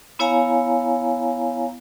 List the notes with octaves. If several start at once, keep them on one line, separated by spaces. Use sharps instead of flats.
B3 E4 C#5 F5 G#5 A#5